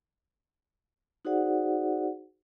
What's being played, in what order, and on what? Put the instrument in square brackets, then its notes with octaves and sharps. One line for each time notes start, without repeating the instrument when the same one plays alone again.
[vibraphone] D#4 F#4 G#4 C5 D5 F#5